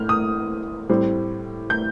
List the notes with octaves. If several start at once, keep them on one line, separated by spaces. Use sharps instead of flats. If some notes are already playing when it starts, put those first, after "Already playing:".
Already playing: A2 F6 G6
D#6
A2 G3 C4
G6